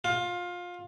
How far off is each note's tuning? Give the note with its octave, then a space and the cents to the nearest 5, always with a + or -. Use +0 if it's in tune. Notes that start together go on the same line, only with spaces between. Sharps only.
F4 +20